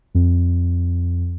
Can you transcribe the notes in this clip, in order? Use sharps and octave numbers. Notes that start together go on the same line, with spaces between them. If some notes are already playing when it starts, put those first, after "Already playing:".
F2